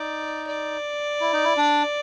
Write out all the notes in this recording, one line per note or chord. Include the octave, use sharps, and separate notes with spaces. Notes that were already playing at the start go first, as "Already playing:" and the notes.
Already playing: D#4 D5
D5
E4
D#4
E4
D4